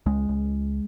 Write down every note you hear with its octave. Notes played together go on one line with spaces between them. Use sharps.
C#2 G#3
C#2